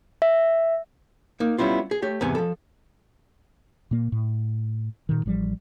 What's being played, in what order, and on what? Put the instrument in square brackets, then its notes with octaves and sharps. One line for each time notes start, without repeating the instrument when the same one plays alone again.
[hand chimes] E5
[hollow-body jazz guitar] A#3 D#4
G3 B3 C#4 E4 F4
G#4
A3 G4 C#5
E2 G#2 C3 B3 G#5
F3 A4
[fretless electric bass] A#2 A#3
A2
A#2 D#3
A1 F3 G3